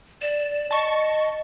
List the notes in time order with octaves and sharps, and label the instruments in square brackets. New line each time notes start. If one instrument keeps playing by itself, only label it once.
[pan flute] D5 [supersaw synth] E7
[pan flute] D#5 [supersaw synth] A5 C#6